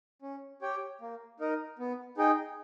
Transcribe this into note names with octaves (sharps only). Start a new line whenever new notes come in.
C#4
G4 C#5 G5
A#3
D#4 A#4 D#5
B3
D#4 G#4 D#5 G5